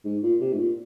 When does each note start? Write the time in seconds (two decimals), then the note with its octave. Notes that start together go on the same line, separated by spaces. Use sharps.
0.04 G#2
0.23 A#2
0.41 C3
0.53 G#2
0.58 A#2